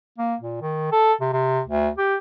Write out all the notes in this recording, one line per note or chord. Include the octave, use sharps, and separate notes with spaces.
A#3
A#2
D#3
A4
C3
C3
D2
G4